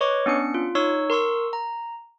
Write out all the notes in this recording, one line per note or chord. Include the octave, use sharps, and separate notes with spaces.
B4 C#5 D#5 C#6 D6
B3 C#4 D4 C#7
F4
D#4 C#5 C#6 E6
A#4 C6 C#6 E6
A#5